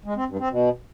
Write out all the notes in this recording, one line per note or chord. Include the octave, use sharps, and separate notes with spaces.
G#3
C4
G2
C4
B2